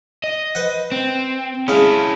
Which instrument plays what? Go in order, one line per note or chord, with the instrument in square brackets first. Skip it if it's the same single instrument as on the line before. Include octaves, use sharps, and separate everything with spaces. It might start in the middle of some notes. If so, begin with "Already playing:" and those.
[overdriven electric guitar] D#5
[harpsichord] B4 C5 F#5
[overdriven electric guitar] C4
[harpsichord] C#3 G#3 F5 [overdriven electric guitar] C#4 E4